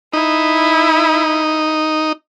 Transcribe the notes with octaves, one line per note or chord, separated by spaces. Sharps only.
D#4 E4